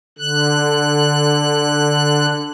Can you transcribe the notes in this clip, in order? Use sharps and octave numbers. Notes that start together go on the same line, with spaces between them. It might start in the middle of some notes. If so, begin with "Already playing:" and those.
D3 F#6